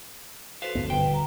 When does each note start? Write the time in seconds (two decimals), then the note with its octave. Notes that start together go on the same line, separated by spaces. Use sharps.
0.62 F#4 A4 B4 C5 F5
0.75 D2 G2 B3
0.90 D#1 D3 G3 B4 G5
1.14 A#5